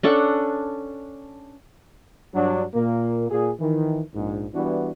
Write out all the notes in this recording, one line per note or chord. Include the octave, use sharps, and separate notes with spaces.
C#4 D4 A4 F#5
G2 F#3 D4
A#2 A#3
A#2 G#4
D#3 E3
A#1 G#2
E3 G3 B3 D4 E4 F#4